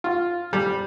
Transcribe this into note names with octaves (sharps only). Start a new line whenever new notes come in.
F4
G3